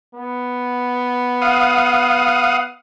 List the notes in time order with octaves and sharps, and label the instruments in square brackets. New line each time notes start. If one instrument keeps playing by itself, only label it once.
[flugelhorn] B3
[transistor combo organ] F5 F#5 D#6